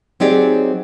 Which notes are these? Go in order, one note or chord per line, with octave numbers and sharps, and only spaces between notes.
F#3 C4 D#4 G4 G#4 D5